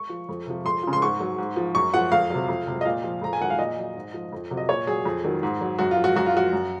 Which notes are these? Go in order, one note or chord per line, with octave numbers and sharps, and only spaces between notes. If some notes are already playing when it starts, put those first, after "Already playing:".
Already playing: C#6
F3
F2
C3 F3
F2 C6
C#3 F3
C6
G#2 C#6
F#3
G#2
F3
F#2 C#6
F3 F#5
F2 F5
C3 F#3
F2
C3 F#3
D#5
A#2 F5
F3
F2 A#5
G#5
D#3 F#3 F#5
F5
A#2 D#5
F#3
G#2
F3
F2
C3 F#3
D#5
A#2 C#5
F#3 G#4
F2
D#3 F#3
G#2
F#3
F#2 F#4
F4
F3
F#4
F#2 F#4
F4
F3 F#4
F#2